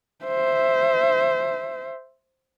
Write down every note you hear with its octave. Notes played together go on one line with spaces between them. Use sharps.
C5 E5